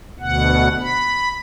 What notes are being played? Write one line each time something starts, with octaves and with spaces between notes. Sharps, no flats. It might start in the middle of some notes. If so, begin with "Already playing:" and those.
D2 B2 F#5
B5